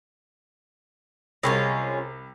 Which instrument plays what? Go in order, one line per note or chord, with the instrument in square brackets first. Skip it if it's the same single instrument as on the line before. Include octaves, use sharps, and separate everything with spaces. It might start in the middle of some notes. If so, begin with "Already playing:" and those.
[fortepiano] C2 [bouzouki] G#3 C#4 F4